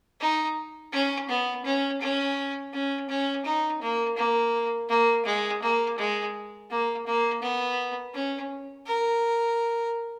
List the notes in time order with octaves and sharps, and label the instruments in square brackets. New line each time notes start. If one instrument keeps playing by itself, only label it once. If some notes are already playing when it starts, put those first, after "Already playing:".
[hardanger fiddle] D#4
C#4
B3
C#4
C#4
C#4
C#4
D#4
A#3
A#3
A#3
G#3
A#3
G#3
A#3
A#3
B3
C#4
A#4